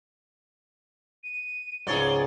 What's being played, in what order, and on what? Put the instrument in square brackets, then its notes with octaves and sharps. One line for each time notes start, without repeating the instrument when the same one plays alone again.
[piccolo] D#7
[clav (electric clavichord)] C#2 G#2 [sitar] G#4 C#5 D5 [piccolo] G7